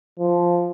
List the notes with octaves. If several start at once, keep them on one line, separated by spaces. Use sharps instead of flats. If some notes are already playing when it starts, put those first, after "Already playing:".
F3